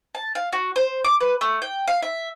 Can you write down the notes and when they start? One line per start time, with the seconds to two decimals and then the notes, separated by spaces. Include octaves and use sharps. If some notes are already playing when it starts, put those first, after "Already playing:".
0.15 A5
0.35 F5
0.53 F#4
0.76 C5
1.04 D6
1.21 B4
1.41 A3
1.62 G5
1.88 F5
2.02 E5